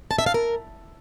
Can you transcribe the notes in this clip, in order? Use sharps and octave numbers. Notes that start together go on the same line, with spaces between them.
A5
E5
F5
A#4